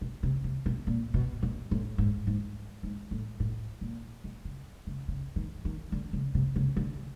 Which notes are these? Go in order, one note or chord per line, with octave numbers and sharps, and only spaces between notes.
B2
C3
C3
B2
A#2
B2
A#2
A2
G#2
G#2
G#2
A2
A2
A#2
B2
C#3
C#3
C#3
D#3
D#3
D3
C#3
C3
C#3
D3